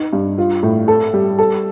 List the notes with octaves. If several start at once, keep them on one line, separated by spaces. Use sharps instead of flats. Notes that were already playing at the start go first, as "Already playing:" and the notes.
Already playing: D#4
G2
F4
A2
A4
G3
A4